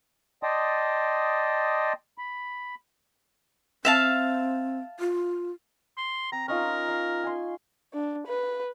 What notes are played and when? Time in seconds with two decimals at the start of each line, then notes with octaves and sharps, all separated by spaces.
0.43 D5 D#5 G5 A5 C6 D#6
2.18 B5
3.85 C4 E5 F5 A5
5.00 F4
5.97 C6
6.32 C4 A#5
6.48 C#4 D#4 F4 A#4
6.89 F5
7.23 G#5 C6
7.93 D4
8.27 B4